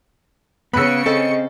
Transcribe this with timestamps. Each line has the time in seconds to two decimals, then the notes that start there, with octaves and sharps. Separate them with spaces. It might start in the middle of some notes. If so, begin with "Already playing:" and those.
0.73 C#3 B3 B5 E6 F#6 C#7
1.06 C4 A4 D#5